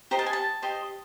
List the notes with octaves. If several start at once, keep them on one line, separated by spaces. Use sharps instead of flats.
G4 C5 D#5 A#5
A5
G#5
A5
G4 C5 D#5